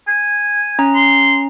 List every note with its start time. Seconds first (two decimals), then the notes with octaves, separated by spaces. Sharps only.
0.08 G#5
0.79 C#4 A#5
0.95 C6